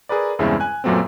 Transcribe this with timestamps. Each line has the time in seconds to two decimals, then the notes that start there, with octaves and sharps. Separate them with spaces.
0.09 G#4 A#4 B4 D5
0.39 E2 G2 C#3 G#3 C4 E4
0.60 G#5 F#6
0.84 F#2 A#2 F#3 A3 B3 C4